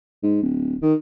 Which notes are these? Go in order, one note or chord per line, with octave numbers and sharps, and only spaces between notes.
G#2
D1
D#3